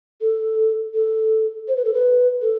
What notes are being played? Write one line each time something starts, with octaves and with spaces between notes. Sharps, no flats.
A4
A4
C5
B4
A4
B4
A4